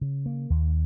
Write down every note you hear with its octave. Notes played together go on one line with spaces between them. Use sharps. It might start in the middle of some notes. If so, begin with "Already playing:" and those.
C#3
A#3
D#2